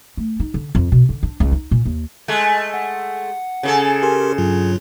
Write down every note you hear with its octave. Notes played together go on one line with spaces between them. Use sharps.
A3
D#4
D3
F2
B2
D3
D4
C#2
D#4
A#2
D#2
G#3 A3
F#5
C#3 G#4 A4
G4 A#4 C6
G2 F#3 F4